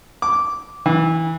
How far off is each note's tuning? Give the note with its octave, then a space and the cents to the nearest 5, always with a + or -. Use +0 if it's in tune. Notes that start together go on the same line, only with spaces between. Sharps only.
D6 -10
E3 -20